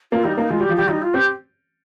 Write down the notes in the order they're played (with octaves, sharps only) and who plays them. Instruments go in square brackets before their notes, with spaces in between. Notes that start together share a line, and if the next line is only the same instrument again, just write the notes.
[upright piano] A#3 [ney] F4
[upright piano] G3 [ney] D#4
[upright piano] A#3 [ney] D#4
[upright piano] G#3 [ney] F4
[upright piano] G3
[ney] G4
[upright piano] F3
[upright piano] G3 [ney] G4
[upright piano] G3 [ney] D#4
[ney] F4
[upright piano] C4 [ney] G4